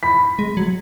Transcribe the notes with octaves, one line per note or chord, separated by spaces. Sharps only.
B5 B6
G#3
F#3